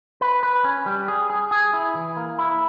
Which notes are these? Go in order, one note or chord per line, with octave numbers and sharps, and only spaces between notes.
B4
B4
C#4
G3
G#4
G#4
G#4
E4
E3
A#3
E4